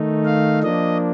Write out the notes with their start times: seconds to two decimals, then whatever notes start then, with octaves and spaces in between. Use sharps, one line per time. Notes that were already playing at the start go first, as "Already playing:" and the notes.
Already playing: D#3 A3 D#4
0.25 F5
0.63 F3 A#3 D4 D#5